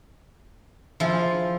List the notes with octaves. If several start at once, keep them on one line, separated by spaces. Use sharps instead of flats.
F3 E4 F4 G#4